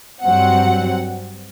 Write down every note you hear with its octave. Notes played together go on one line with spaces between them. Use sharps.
G2 F#3 C4 F#5